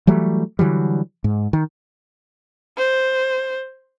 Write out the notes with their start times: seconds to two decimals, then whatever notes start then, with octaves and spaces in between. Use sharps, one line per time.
0.07 E3 F#3 G3 A3
0.59 D3 E3 F#3 G3
1.24 G#2
1.53 D#3
2.77 C5